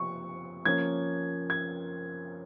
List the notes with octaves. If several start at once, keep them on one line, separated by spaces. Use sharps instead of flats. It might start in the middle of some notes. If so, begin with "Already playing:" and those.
Already playing: C3 F3 C#6
F3 A#3 C#4 G#6
G#6